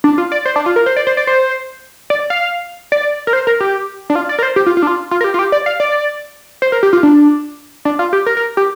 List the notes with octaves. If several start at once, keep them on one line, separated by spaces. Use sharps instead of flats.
D4
F4
D5
C5
D4
F4
A#4
C5
D5
C5
D5
C5
D5
F5
D5
A#4
C5
A#4
G4
D4
F4
D5
A#4
C5
G4
F4
F4
D4
F4
F4
A#4
G4
F4
G4
D5
F5
D5
C5
A#4
G4
F4
D4
D4
F4
G4
A#4
A#4
G4